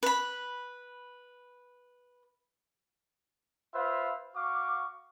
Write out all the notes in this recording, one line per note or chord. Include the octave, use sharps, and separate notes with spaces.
B4 B5
F4 B4 C5 E5 F5
F#4 F5 C#6 D6